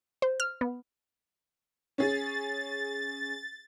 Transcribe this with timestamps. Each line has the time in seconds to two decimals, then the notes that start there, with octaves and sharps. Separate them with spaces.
0.22 C5
0.40 F6
0.61 B3
1.98 C#4 G#4 A6